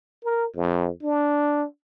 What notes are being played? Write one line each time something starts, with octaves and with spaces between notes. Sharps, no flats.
A#4
F2
D4